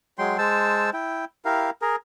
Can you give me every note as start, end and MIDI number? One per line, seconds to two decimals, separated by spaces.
0.18 0.37 54
0.18 0.37 56
0.18 0.37 79
0.18 0.37 84
0.38 0.90 56
0.38 0.90 72
0.38 0.90 81
0.38 0.90 88
0.93 1.25 64
0.93 1.25 79
1.45 1.70 64
1.45 1.70 67
1.45 1.70 70
1.45 1.70 77
1.82 1.96 68
1.82 1.96 70